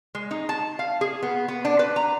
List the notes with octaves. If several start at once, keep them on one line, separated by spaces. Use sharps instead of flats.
G#3
D#4
A5
F5
G#4
B3
B3
D4
B4
A#5